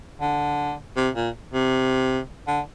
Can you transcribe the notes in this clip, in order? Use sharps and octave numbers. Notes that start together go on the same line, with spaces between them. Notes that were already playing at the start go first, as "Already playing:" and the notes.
D3
C3
A#2
C3
D3